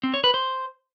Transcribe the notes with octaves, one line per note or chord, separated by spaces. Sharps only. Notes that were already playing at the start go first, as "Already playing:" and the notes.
C4
C#5
B4
C5